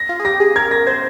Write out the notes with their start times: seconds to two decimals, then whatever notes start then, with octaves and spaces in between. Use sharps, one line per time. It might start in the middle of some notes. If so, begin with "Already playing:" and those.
Already playing: A#6
0.09 F4
0.20 G#4
0.25 G4 A#6
0.40 G#4
0.56 A#4 G#6
0.71 A#6
0.87 C5 G#6